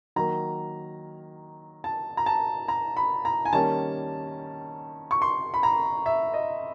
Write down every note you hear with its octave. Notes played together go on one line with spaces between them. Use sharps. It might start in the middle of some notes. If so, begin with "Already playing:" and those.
D#3 F#3 A#3 A#5
A5
A#5
A5
A#5
B5
A#5
G#5
D#3 G3 A#3 C#4 A5
C#6
C6
B5
A#5
E5
D#5